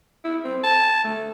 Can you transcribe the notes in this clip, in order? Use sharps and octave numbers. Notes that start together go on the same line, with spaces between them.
E4
C4
A5
A3